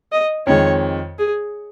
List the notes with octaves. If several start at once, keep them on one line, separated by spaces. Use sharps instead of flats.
D#5
F2 D#3 G#3 C#5
G#4